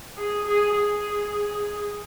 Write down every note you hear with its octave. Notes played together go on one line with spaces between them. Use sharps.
G#4
G#4
G#4